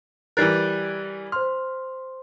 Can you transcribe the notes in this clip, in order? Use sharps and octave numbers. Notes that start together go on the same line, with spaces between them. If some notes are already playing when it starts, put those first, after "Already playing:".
E3 G3 A#4 F#6 A6 C7
C5 C6 F6